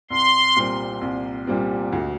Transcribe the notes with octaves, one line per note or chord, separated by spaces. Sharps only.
C2 C6
A#2 G3 C4
C2
A#2 G3 C4
D2